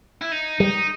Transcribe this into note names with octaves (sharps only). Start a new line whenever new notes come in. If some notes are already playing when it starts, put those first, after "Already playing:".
E4
D#4
G3 D#4